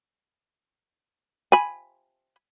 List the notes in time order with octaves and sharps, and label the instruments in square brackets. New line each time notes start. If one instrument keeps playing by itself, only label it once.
[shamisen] G#5 B5